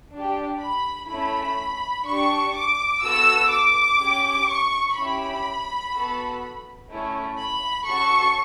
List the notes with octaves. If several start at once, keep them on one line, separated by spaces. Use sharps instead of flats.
D4 G4
B5
A3 C#4 E4 B5
D4 G4 C#6
D6
B3 F#4 A4 E6
D6
C#4 G4
C#6
C#4 E4 G4 B5
B3 F#4 A4
A3 C#4 E4
B5
C#4 F#4 A4 C#6